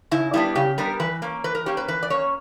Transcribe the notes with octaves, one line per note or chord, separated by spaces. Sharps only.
C#3 E4
G3 B3 D4 E4
C#3 G4
G3 B3 D4 A#4
E3 B4
A#3 C#4
E3 B4
A#4
A#3 C#4 G4
B4
E3 B4
D5
A#3 C#4 C#5